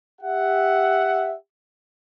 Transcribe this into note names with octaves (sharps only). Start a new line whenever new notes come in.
G4 E5 F#5